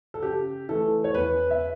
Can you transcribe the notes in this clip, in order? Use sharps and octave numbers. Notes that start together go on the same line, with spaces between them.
A4
C#3 G4
E3 A3 A4
C#5
E2 B4
E5